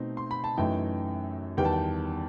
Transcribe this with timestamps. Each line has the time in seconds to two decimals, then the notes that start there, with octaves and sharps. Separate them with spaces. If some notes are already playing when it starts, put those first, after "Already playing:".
Already playing: B2 A3 C4 D#4
0.17 C6
0.31 B5
0.44 A5
0.57 F#2 E3 A3 D#4 G5
1.57 E2 D#3 G3 B3 G5
1.65 A5
1.72 G5